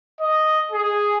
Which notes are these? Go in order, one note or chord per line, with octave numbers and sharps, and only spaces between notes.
D#5
G#4